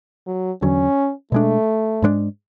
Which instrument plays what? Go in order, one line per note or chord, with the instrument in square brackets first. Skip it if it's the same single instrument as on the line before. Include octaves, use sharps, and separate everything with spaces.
[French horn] F#3
[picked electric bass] E2 D3 F#3 [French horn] C#4
[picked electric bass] B2 G#3 D4 [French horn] A3
[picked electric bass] G#2 G#3 B3 D4